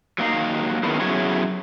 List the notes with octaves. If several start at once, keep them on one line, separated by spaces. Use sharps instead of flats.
F#3 A#3 D#4 F5
D#3 B3 C#4 E4 G#4
F#3 B3 C#4 E4 F#4 G#4